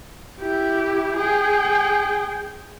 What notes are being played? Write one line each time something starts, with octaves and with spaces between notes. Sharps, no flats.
E4 G4
G#4 G5